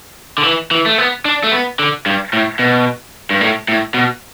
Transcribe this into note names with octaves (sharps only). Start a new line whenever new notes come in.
D3
E3
E3
A3
B3
D4
A3
B3
D3
G2
A2
B2
G2
A2
A2
B2